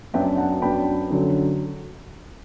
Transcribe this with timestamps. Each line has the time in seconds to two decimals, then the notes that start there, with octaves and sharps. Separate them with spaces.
0.13 F#2 F#3 B3 D4 E5 G5
0.37 F#5 A5
0.62 F#2 F#3 B3 D4 G5 B5
1.10 F#2 D3 F#3